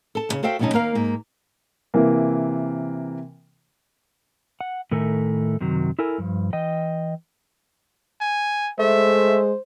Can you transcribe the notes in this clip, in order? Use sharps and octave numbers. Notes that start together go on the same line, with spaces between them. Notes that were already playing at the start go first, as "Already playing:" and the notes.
A4 A5
D#2 C#3
F#4 A4 C5 E5 F5 G5
F2 B2 G3 C#4 D#4 A5
D#2 A#3 A#4 F5
G#2 A#3
C3 E3 A#3
F#5
A2 D#3 A3 A4 A#4 G#5
F#2 C3 D#3 F#3
E4 A4 A#4 G#5
G2 F3
E3 D#5 G5
G#5
G#3 A3 C5 E5